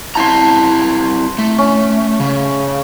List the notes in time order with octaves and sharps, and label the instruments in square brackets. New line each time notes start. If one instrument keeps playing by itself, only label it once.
[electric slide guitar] C4 E4 A#5 [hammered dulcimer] A5 C6
[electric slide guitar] A3
[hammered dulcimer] C#4
[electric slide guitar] C#3